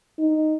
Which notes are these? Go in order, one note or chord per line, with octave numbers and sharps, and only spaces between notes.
D#4